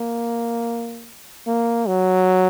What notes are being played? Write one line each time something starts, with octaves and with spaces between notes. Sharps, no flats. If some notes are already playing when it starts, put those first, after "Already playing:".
Already playing: A#3
A#3
F#3